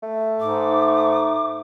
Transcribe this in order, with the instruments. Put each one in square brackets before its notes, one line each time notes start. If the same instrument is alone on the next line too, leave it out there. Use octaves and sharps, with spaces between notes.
[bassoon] A3
[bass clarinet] G#2 [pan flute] D6